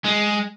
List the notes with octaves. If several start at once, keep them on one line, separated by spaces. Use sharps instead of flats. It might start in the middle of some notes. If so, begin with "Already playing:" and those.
G#3